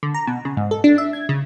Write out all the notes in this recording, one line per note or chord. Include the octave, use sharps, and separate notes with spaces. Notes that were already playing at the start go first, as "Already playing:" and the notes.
D3
A#5
B2
C#3
G#2
A4
D4
E5
G#6
C#3